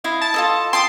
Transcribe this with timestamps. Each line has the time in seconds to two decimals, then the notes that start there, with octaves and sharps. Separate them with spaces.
0.04 E4 D#5 F5
0.21 A5
0.34 F4 A4 D#5
0.73 G5 A5 C6 D#6